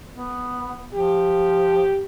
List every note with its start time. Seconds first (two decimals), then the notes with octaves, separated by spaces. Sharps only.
0.15 B3
0.94 F3 G4